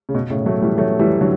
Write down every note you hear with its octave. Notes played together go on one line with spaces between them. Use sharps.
C#3
B2
A2 C#3
F#3 A3
E3 G3
F#3 A3
E3 G3
D3 F#3